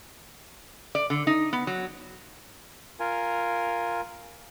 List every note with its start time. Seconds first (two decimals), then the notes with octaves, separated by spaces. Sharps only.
0.95 D5
1.10 D3
1.27 D#4
1.53 B3
1.67 F#3
3.00 F4 A#4 G#5